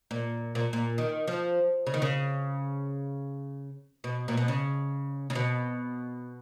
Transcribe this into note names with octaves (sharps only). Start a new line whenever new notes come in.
A#2
A#2
A#2
D#3
F3
C#3
D#3
C#3
B2
A#2
B2
C#3
C#3
B2